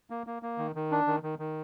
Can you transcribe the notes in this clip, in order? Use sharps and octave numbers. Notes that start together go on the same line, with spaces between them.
A#3
A#3
A#3
D#3
D#3
D4
D#3
D#3
D#3